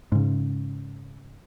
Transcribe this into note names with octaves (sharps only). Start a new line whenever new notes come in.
G#2 C#3